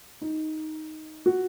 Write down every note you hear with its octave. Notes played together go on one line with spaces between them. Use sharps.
D#4
F#4